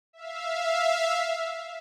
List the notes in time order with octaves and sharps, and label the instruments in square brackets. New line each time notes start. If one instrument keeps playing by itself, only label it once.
[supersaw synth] E5 F5